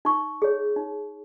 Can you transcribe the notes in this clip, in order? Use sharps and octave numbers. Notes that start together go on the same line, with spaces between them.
D#4 C#6
G#4 C#5
D#4